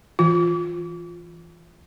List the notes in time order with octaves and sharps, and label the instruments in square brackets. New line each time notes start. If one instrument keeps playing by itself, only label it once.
[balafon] E3 F4